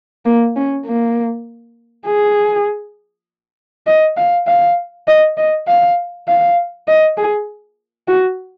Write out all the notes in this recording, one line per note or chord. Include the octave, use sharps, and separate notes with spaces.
A#3
C#4
A#3
G#4
D#5
F5
F5
D#5
D#5
F5
F5
D#5
G#4
F#4